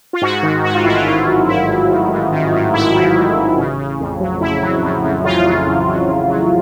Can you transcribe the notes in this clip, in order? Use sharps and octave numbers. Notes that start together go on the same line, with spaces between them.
F4
G#2 F#4
D#3
G#2 F#4
F4
A1 E4
F4
G#2 F4
F#3
A1 E4
A1
D#3
G#2
D#3
G#2
A1 E4
D#3
G#2
A1
C#3
C#3
F2
F#3
F2 E4
F#3
F2
F2
C#3 F4
F#3
F2
F#3
F2
F#3